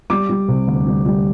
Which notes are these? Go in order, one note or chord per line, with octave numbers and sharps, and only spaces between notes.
G3 D6
G3
C3
D2
G3
G3